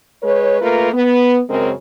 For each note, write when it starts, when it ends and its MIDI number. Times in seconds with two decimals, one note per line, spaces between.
0.23 0.58 56
0.23 0.58 71
0.23 0.58 73
0.61 0.89 57
0.61 0.89 58
0.61 0.89 65
0.61 0.89 70
0.61 0.89 71
0.93 1.41 59
1.49 1.72 42
1.49 1.72 49
1.49 1.72 56
1.49 1.72 60
1.49 1.72 70